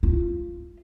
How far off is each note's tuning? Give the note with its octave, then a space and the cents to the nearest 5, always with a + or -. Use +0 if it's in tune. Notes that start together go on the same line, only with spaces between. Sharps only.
F4 -15